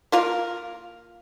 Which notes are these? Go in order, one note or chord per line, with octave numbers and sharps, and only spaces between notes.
A#3 F4 A#4